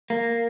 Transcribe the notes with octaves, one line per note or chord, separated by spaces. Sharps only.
A#3